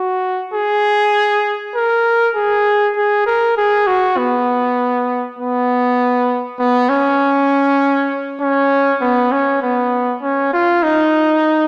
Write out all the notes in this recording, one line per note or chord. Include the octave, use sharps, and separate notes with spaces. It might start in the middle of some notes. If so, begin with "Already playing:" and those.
Already playing: F#4
G#4
A#4
G#4
G#4
A#4
G#4
F#4
B3
B3
B3
C#4
C#4
B3
C#4
B3
C#4
F4
D#4